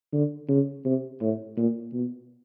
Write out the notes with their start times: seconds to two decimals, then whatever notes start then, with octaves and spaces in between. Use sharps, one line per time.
0.13 D3
0.49 C#3
0.85 C3
1.21 A2
1.57 A#2
1.93 B2